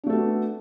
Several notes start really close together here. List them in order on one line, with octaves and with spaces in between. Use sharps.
D4 A3 A4 F#4 B3